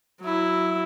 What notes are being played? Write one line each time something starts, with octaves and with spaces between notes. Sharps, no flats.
F#3 E4